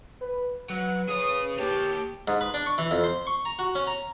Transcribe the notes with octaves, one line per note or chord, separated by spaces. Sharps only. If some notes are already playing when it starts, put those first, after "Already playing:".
B4
F#3 B4 F#5
G#4 C#5 D#6
A#3 G4 C#5 A5
G#2
B4
D4
C#6
E3
F2
C5
C#6
A#5
F#4
C#4
A#5